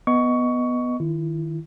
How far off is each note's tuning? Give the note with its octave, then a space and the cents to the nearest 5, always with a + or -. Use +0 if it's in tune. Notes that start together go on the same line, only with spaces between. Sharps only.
B3 +0 D#5 +0 C#6 +15
D#3 +0 E4 +30